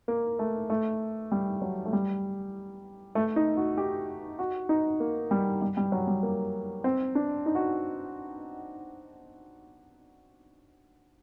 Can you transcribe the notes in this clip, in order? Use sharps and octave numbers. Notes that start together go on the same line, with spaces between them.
A#3
A3
A3
G3
F#3
A3
G3
A3
D#4
F#4
G4
F#4
D#4
A#3
G3
G3
G3
F#3
G3
A#3
C4
D4
D#4
F#4